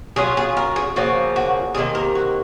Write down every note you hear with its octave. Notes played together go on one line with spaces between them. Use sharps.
F#3 C#4 F4 G#4
G#4
A#4
G#4
C#3 F3 A#3 C#4 F#4
F#4
C3 D#3 A#3 G#4
A#4
F#4